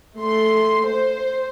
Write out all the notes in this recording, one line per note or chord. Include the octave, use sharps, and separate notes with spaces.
A3 C6
C5